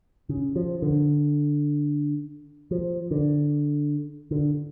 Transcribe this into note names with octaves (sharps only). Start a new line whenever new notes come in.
C#3
F3
D3
F3
D3
D3